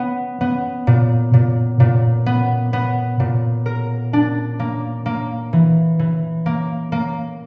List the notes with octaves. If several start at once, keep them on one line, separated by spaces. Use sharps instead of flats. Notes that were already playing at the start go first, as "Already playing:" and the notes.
Already playing: B3
B3
A#2
A#2
A#2
B3
B3
A#2
A#4
D4
A#3
A#3
E3
E3
A#3
A#3